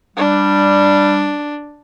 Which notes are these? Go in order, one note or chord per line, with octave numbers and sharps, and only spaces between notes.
G3 D4